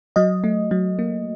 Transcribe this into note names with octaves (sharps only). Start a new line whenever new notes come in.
F#3 D#5
A3
F#3
A#3